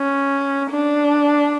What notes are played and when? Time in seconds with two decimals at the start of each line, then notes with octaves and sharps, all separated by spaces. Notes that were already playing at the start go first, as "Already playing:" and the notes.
Already playing: C#4
0.71 D4